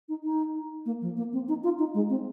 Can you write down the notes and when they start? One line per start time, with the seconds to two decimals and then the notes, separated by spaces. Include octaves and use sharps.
0.09 D#4
0.24 D#4
0.86 A#3
1.01 F3
1.17 A#3
1.33 C4
1.48 D#4
1.64 F4
1.78 D#4
1.94 G#3
2.09 C4